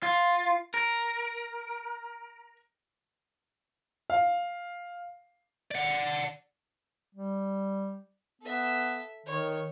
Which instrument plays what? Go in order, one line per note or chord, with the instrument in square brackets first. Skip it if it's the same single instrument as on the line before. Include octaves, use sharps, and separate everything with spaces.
[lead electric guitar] F4
A#4
[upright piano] F5
[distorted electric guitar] D5 F#5
[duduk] G3
[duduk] B3 [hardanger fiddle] A4 E5
[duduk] D#3 [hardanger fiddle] C#5